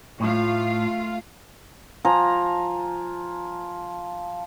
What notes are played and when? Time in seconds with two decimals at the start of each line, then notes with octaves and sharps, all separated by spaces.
0.20 A2 A3 F4 F5
2.05 F3 G#5 A#5